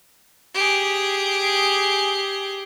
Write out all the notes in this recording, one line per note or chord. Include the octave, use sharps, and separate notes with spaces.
G4 G#4